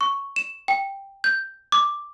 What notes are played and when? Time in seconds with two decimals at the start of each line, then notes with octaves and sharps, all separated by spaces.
0.01 C#6
0.36 E7
0.68 G5
1.24 G6
1.72 D6